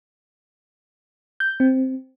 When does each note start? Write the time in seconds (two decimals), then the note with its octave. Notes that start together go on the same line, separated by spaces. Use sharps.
1.40 G6
1.60 C4